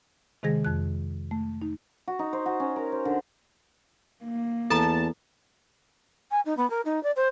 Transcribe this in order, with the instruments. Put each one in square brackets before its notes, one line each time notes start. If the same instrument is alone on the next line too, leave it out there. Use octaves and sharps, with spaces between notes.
[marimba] C3 D#3 G#3 G#4 A#6
F2 F#6
A3
D#4
[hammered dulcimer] F#4
D#4
C5
F#4
C#4
A#4
C5
D3
[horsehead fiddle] A#3
[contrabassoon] E2 [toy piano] A4 A#5 [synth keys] A5
[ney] G#5
D#4
B3
A#4
D#4
D5
C5